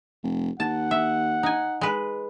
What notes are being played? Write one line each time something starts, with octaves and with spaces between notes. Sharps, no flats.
F1
D#2 F#5 A5
E5
D#4 G#5
G#3 B4